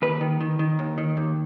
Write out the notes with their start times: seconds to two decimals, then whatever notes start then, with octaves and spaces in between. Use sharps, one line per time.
0.02 D#2 B4
0.21 D#3
0.40 D#3
0.59 D#3
0.79 D#2
0.98 D#3
1.17 D#2